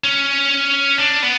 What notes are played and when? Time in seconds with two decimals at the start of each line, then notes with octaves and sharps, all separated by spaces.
0.04 C#4
0.98 D4
1.23 B3